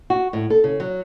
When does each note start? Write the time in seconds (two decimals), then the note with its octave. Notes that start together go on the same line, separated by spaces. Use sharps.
0.10 F#4
0.33 A2
0.50 A4
0.64 C#3
0.80 F#3